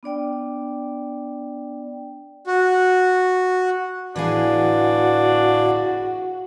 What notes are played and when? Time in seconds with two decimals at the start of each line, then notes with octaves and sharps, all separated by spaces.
0.03 B3 D4 D5 G5
2.47 F#4
4.16 G1 A2 E3 B3 D4 F#4 G#4 F5